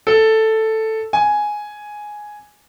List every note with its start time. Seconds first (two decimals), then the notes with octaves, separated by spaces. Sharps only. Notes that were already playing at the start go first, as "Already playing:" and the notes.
0.07 A4
1.13 G#5